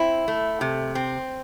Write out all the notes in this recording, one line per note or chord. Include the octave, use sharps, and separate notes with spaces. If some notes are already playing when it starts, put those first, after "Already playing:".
Already playing: C4 E4
A3
C3
C4